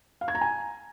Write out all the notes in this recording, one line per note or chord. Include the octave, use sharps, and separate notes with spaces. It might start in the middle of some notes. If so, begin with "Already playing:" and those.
F5
G#6
A#5
G#5